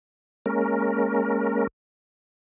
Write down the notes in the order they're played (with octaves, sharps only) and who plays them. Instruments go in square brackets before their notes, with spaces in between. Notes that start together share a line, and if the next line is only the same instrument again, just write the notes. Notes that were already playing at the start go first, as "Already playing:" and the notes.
[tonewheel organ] G#3 A#3 C#4 A#4